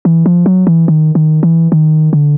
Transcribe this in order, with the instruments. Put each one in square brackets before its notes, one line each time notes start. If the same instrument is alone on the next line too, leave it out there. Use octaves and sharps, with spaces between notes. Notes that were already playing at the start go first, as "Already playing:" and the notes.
[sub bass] E3
F3
F#3
E3
D#3
D#3
E3
D#3
D3